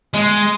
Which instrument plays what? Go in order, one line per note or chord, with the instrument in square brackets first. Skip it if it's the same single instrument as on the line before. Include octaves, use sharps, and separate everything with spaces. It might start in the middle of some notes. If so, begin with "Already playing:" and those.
[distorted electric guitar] G#3